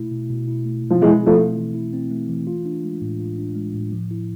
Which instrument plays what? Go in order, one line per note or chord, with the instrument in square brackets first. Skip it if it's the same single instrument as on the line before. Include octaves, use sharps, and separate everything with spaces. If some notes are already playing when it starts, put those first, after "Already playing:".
Already playing: [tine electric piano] B2 A3 E4
B2
B2
E4
A3
B2
[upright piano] F3
[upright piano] E3 G#3 [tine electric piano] E4
[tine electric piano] C4
[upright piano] F3 A3
[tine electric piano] A3
E3
E4
C4
A3
E3
F4
D4
G#3
A2
F4
D4
G#3
A2
F3
E4